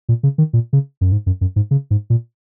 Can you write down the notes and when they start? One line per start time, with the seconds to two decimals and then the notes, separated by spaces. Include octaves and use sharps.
0.09 A#2
0.23 C#3
0.38 D#3
0.53 A#2
0.73 C#3
1.01 F#2
1.12 G#2
1.26 F#2
1.41 F#2
1.56 G#2
1.71 C#3
1.91 G#2
2.10 A#2